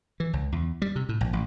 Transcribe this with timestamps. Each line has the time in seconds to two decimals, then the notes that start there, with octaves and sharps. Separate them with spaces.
0.20 E3
0.33 C#2
0.52 E2
0.82 G3
0.96 C3
1.09 A2
1.21 A#1
1.33 A1